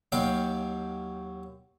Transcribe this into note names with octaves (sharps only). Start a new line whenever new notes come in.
D#2 F#3 F#4 F5 G5